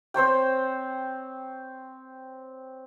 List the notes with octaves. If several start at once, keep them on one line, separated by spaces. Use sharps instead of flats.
C4 C5 C#5 G5